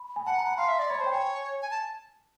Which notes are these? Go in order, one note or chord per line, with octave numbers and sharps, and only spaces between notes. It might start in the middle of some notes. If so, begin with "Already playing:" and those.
Already playing: B5
G#5
F#5 A5
A#5
B5
F5 C6
E5
D5
C#5 B5
C5 A5
G5
C#5 G#5
G#5
A5